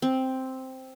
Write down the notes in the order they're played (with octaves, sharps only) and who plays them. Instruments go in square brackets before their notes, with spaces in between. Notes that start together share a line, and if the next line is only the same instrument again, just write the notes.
[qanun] C4